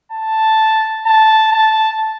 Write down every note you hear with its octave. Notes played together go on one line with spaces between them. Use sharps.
A5
A5
A5